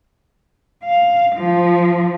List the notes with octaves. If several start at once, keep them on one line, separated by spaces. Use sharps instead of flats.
F5
F3